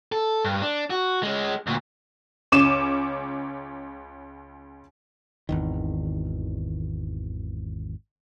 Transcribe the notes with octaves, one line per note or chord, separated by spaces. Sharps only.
A4
G2
D4
F#4
G#3 C#4
D2 A#2
C#2 C#4 D6 D#7 E7
G#1 E2 D#3